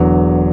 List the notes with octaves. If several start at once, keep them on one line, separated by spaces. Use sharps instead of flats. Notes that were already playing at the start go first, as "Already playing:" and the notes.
Already playing: E1 E2 D3 F#3